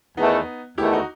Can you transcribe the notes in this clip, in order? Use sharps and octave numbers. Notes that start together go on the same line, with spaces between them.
E2 D#3 A3 B3 D#4
E2 D#3 A3 E4 G4
D#4 F#4